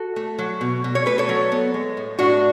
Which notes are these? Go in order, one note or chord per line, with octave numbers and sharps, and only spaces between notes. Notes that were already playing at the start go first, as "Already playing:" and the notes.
Already playing: F#4 A4
A3
F#3
B2
B2
C#5
A3 B4
A4 C#5
F#3
B3
G#3
A2
A2 D4 F#4